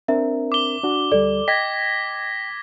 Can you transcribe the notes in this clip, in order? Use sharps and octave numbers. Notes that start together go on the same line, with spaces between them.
C4 D4 A#4 E5
D6 G7
D4 F#4
D2 G3 A4 D5
D#5 G5 G#6 A#6 B6